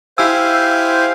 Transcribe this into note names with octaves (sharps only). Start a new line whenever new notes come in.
E4 G4 C5 F5 G#5 E6